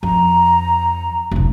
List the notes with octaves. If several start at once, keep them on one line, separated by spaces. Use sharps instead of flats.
F2 A#5
F1 C3